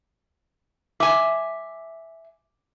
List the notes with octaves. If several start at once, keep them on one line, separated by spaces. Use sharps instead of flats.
E5 G#5 D6